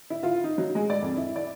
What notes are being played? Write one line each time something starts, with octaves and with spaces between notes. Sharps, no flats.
E4
F4
D#4
F#3
G#3
D5
F2
E4
D5